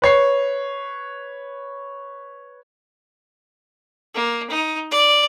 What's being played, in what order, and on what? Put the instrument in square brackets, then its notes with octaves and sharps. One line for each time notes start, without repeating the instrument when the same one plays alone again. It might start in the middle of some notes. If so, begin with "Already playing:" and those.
[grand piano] B4 C#5 C7
[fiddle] A#3
D#4
D5